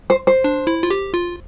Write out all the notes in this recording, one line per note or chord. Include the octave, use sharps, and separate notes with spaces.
C5
C5
D4
E4
F4
G4
F4